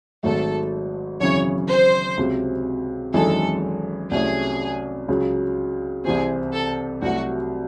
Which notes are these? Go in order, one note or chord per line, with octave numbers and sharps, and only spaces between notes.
G#1 G#2 F#3 A3 A4
G#1 F#2 C#3 E3 C#5
C5
C#2 C3 F#3
G#1 F#2 E3 G#3 D#4 A4
C2 C3 F#3 A3 C#4 G#4
C#2 C#3 F#3
C2 C3 E3 C4 G#4
A4
C2 C3 F#3 A3 F#4